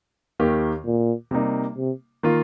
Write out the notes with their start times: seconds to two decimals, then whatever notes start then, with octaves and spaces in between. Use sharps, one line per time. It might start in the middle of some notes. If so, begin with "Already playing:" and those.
0.39 D#2 D#3 A#3 G4 A#4
0.85 A#2
1.31 C3 G3 A#3 D#4
1.77 C3
2.23 D#3 A#3 F4